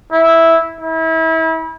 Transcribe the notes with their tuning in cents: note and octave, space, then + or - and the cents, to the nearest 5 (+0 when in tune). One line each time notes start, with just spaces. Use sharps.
E4 -5
E4 -30